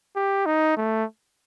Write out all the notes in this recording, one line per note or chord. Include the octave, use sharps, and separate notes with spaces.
G4
D#4
A3